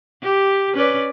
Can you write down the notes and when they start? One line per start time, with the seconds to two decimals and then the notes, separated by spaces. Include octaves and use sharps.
0.22 G4
0.74 C#4 B4 D5